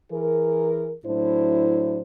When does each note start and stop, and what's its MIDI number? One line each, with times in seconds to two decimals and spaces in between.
0.12 0.94 52
0.12 0.94 68
0.12 0.94 70
1.05 2.01 45
1.05 2.01 54
1.05 2.01 62
1.05 2.01 64
1.05 2.01 72